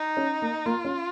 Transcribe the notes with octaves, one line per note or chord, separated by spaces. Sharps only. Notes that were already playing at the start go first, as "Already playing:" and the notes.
Already playing: D#4
C#4
A#3
A#3 F4
C#4